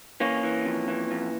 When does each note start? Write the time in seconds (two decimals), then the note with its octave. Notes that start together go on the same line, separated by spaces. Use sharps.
0.20 E3 A#3 C#4
0.43 E3
0.65 F2
0.88 E3
1.11 F2